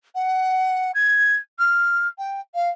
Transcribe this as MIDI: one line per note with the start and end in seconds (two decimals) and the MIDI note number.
0.15 0.92 78
0.95 1.36 92
1.59 2.08 89
2.18 2.40 79
2.54 2.69 77